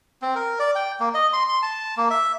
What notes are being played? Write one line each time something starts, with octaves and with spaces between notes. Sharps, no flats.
C4
A#4
D5
G5
A#3
D#5
C6
C6
A5
A#3
E5